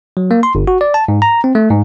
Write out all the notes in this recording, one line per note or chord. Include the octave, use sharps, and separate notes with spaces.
F#3
A#3
C6
G1
F#4
D5
A5
G#2
A#5
C4
A3
G#2